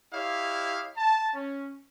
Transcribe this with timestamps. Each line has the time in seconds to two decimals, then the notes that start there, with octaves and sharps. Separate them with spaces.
0.13 E4 G4 C#5 D#5 F5
0.97 A5
1.34 C#4